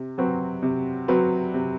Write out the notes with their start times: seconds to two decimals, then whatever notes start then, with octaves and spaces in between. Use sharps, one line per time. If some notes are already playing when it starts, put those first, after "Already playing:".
Already playing: C3
0.18 F#3 C4 F#4 B4
0.63 C3
1.08 F#3 C4 F#4 B4
1.54 C3